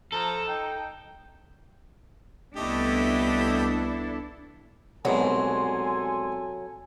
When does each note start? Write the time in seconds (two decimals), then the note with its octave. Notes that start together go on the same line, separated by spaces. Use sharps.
0.12 F3 A4 A#5
0.48 D#4 G5
2.57 C2 A3 B3 D4 E4 G4 A4 D#5
5.05 C2 G#2 B2 F#3 A4 G#5 C6